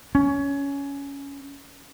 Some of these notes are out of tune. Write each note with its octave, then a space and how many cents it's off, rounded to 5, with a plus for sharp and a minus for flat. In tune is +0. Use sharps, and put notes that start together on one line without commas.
C#4 +15